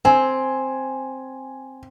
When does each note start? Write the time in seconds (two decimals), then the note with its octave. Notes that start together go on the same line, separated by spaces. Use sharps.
0.05 C4 G#5